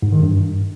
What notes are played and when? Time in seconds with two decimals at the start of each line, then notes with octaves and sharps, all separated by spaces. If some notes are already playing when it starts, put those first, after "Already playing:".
0.02 G#2
0.12 D#3
0.22 G2